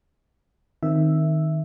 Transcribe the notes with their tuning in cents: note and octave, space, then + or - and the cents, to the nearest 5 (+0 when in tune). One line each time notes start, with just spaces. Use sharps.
D#3 +0 C4 +0 E5 +0